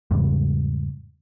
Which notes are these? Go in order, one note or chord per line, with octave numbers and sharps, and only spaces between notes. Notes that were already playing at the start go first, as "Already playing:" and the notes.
E2 G#2 C#3 G3